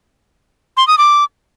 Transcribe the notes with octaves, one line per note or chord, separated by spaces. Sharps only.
C6
D#6
D6